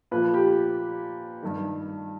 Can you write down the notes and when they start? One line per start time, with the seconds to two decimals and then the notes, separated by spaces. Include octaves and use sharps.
0.11 A#2 F3 B4
0.34 G4
1.43 G2 D#3